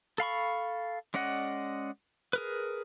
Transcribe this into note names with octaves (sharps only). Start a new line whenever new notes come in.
A4 F5 B5 C#6
G#3 C#4 D5 D#5 F#5
G#4 A#4 B4